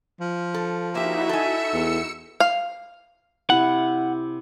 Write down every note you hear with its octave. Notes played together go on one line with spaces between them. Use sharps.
F3
A4
A#3 D#4 E4 F#4 G4 E5
A4 G#5 E6 C#7
E2
F5
C3 E4 F#5